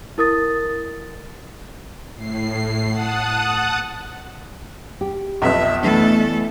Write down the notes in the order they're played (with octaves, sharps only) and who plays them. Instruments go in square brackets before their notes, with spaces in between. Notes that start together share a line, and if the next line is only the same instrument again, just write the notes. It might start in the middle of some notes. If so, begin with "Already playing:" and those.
[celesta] E4 A#4 D#6 A6
[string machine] A2 C7
F#5 A5 D#6 F#6
[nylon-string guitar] G4
[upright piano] B1 F2 B4 [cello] E5
[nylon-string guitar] E3 B3 D4 [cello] A3 A4